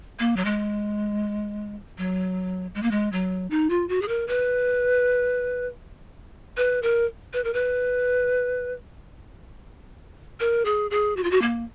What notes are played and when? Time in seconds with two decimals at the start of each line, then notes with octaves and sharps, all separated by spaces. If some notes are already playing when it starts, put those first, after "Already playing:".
0.19 A#3
0.37 F#3
0.45 G#3
1.98 F#3
2.75 G#3
2.83 A#3
2.91 G#3
3.12 F#3
3.51 D#4
3.70 F4
3.89 F#4
4.02 G#4
4.08 A#4
4.28 B4
6.57 B4
6.83 A#4
7.33 B4
7.44 A#4
7.54 B4
10.40 A#4
10.65 G#4
10.91 G#4
11.17 F#4
11.23 F4
11.31 F#4
11.42 A#3